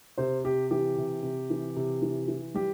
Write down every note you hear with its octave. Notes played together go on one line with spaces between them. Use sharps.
C3 C5
C3 G4
E3 G4
C3
C3
E3
C3
E3
E3
G3 G4